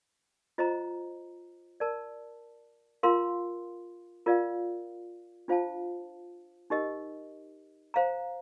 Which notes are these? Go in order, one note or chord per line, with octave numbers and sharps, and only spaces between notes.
F4 C5 D#5 A#5
A#4 D5 A5
F4 A#4 F5 C6
F4 A#4 D5 F5
D4 F4 C5 F5 A5
D#4 G4 A#4 D#5
C5 F5 A#5